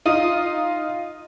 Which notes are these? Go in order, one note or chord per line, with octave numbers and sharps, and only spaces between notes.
D#4 F4 D#6 D#7